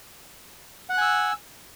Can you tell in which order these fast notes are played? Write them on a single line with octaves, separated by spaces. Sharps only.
F#5 F#6 G#5 E6